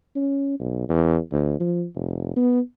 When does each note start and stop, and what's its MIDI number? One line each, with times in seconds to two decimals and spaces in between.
0.16 0.56 61
0.60 0.86 35
0.89 1.17 40
1.31 1.58 38
1.60 1.84 53
1.95 2.33 29
2.36 2.60 59